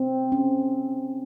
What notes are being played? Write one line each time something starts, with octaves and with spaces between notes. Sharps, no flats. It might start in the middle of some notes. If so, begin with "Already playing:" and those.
Already playing: C4
C#4